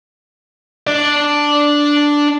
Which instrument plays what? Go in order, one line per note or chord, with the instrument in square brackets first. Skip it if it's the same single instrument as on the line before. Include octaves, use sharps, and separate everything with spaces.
[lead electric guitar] D4 D5